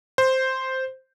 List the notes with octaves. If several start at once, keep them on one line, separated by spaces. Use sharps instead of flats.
C5